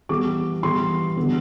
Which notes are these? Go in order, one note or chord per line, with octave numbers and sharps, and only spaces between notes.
E3 G3 B3 D6
E3 G3 B3 C6
D3 G3 B3